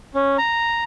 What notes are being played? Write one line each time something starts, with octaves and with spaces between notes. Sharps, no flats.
C#4
A#5